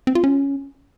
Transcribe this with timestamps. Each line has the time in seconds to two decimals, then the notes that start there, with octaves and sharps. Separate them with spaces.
0.07 C4
0.15 F4
0.24 C#4